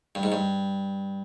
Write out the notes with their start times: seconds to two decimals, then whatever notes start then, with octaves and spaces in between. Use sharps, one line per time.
0.15 G2
0.23 G#2
0.32 G2